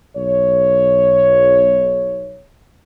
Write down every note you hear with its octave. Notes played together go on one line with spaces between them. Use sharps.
B1 C#5